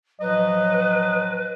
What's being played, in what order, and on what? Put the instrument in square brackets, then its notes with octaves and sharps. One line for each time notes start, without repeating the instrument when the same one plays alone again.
[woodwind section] A2 F3 F#3 [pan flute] B4 [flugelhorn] D#5